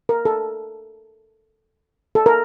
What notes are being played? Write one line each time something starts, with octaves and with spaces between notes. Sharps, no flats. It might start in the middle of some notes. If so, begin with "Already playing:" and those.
A#4
A4
A4
A#4